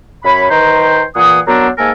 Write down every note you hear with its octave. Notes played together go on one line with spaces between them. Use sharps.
F#2 C#5 B5
D#3 B4 C5 G5 A#5
A#2 E3 G#4 F#5 D#6
F#3 B3 C4 D4 A#4
G#2 A#3 A4 A#4 G#5